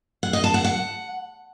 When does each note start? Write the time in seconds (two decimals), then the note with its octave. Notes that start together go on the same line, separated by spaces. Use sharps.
0.23 F#5
0.33 D#5
0.44 A5
0.54 F#5
0.64 F#5